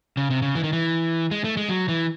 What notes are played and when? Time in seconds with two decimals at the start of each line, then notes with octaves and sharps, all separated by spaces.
0.17 C#3
0.30 C3
0.42 C#3
0.55 E3
0.64 D#3
0.73 E3
1.31 G#3
1.44 A3
1.57 G#3
1.70 F#3
1.88 E3